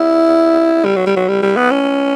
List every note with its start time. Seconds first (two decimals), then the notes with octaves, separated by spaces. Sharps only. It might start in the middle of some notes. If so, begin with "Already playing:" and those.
Already playing: E4
0.85 G3
0.96 F#3
1.07 G3
1.17 F#3
1.28 G3
1.43 G3
1.57 B3
1.71 C#4